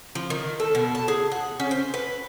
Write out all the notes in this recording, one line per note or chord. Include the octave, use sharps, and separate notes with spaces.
F3
D#3
A4
B2
A5
G#4
F#5
C#4
C5
B4